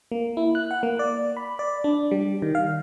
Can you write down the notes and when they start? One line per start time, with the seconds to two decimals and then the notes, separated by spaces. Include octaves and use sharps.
0.12 A#3
0.37 E4
0.55 F#6
0.71 F#5
0.83 A#3
0.99 D5
1.37 B5
1.59 D5
1.84 D4
2.11 G3
2.42 D#3
2.55 F5